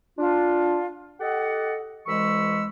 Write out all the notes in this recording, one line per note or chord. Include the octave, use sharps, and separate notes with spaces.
D4 F4
G4 A4 D#5 F#5
C2 E3 G#3 B5 C#6 E6